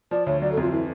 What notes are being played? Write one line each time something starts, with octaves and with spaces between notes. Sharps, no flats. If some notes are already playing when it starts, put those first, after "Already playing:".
F3 D5
D2 C#5
F#3 D5
A4
F2 F4
E3 E4